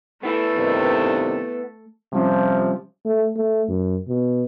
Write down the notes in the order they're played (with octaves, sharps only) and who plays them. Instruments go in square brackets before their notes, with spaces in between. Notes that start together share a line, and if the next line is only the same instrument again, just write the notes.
[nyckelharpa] A3 A4 [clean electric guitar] B3 E4 B4
[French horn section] G2 C3 D#3
[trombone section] C3 F3 [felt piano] G3 C#4
[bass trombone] A3
A3
F#2
B2